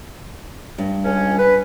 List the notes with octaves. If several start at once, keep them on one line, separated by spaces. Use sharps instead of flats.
G2
C#2 C#4
B4